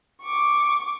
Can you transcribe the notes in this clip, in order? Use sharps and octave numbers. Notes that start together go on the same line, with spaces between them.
C#6 D6